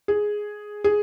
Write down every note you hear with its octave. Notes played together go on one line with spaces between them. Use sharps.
G#4
G#4